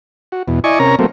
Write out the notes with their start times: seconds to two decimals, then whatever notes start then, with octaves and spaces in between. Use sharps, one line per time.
0.32 F#4
0.48 E2 B2
0.64 E4 D5 D#5 G#5 C#6
0.79 C3 C#4 A#4 C#5 A#5
0.99 F#3 A3 A#3 C4